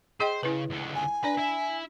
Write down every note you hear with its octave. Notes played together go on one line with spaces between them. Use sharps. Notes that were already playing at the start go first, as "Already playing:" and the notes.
G#4 C5 D#5 G5
C#3 E4 B4
C#2 D3
G#5
D4 B4 D5 B5
E4 E5